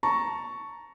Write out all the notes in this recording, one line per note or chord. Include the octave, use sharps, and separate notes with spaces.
A5 A#5 C#6